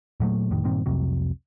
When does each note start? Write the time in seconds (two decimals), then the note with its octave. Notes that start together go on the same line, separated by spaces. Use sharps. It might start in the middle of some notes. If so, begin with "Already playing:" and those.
0.20 A#2 F#3 A3
0.51 F2 A2 D#3
0.64 G2 A#2 D#3 C4
0.86 C2 F2 C3 F#3